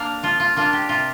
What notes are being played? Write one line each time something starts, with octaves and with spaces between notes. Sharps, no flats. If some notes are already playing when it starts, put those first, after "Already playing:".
Already playing: A#3 D4 F5
F3 F4
F4
A#3 D4 F4
G4
C3 F4